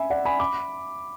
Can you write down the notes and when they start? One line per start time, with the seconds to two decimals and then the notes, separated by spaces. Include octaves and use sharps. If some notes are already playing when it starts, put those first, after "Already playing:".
Already playing: E5 G#5 B5
0.10 D5 F#5
0.25 G#5 B5
0.40 B5 D6